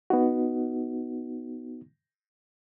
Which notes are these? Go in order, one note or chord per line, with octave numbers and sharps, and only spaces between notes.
B3 D#4 F#4